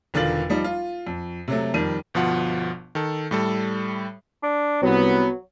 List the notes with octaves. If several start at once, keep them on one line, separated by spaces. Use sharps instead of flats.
E1 D3 D#3 F4 A6 F#7
F3 G3 D#4
F4
F2
C3 F#3 A3
F2 D#3 G3 D#7
G1 B2 F3 F4 F#5
D#3 A4
A2 G3 A4
D4
C2 F#3 B3